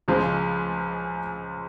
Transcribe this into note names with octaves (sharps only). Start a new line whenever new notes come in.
C#2 C#3 F3 G#3